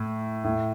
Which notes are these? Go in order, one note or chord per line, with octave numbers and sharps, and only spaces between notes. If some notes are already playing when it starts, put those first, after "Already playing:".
Already playing: A2
A2